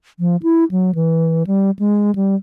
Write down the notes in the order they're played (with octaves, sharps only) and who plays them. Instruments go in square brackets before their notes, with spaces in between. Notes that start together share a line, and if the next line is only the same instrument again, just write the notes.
[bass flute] F3
E4
F#3
E3
G3
G#3
G3